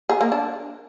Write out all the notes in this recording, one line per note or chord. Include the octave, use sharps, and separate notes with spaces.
G#4
A#3
D4